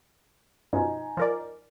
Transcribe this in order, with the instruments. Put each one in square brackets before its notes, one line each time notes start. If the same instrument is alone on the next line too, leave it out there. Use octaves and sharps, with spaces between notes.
[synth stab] F#2 B2 F3 [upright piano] D#4 G#5
[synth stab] F3 A#4 D5